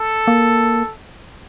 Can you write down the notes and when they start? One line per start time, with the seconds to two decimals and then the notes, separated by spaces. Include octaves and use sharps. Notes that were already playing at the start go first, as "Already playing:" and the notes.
Already playing: A4
0.27 A#3